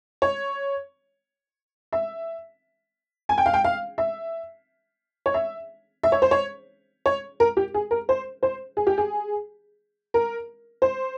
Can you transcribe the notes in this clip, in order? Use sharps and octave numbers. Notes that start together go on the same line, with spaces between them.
C#5
E5
G#5
G5
F5
G5
F5
E5
C#5
E5
E5
C#5
C5
C#5
C#5
A#4
G4
G#4
A#4
C5
C5
G#4
G4
G#4
A#4
C5